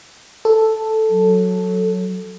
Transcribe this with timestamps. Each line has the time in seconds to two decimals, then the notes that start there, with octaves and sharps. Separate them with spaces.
0.45 A4
1.10 F#3